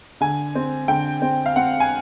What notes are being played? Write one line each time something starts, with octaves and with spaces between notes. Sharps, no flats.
D3 G#5
C4
D3 G5
C4
F5
C4 F#5
G#5